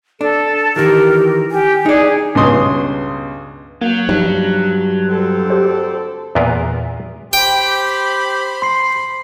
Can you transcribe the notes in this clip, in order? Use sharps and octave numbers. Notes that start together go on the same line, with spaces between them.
D4 A4
D#3 E3 G4 A#4
G4 G#5
D#4 G#4 D5
C#2 G2 B2 C6 D#6
F#3 A#3 G6
G2 F3 D#4
D2 C4 A4
G4 C5
E2 A#2 B3 A#4 B4 F5
G4 C5 G5 B5
C6 C7